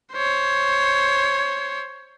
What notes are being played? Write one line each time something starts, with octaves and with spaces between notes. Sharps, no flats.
C5 C#5